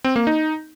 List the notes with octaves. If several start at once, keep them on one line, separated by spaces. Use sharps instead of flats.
C4
A#3
D#4